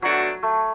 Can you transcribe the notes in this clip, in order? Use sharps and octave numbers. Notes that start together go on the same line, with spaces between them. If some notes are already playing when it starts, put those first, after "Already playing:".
B2 F#3 A3 D4 F#4
A3